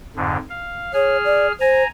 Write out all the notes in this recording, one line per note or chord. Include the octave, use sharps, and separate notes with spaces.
F2 G#2 D3
F5
G#4 C#5 F6
D5
C5 G#5 A#5